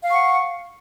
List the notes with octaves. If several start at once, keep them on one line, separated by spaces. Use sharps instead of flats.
F5 F#5 C#6